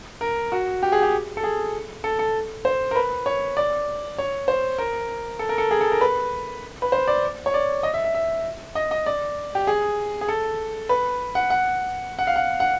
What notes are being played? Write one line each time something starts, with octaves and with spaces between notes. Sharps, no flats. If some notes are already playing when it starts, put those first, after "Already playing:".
A#4
F#4
G4
G#4
G4
A4
G#4
A4
A4
C5
A#4
B4
C#5
D5
C#5
C5
A#4
A4
A#4
A4
G#4
A4
A#4
B4
B4
C5
D5
C#5
D5
D#5
E5
E5
E5
D#5
D#5
D5
G4
G#4
G#4
A4
B4
F#5
F#5
F#5
F5
F#5
F#5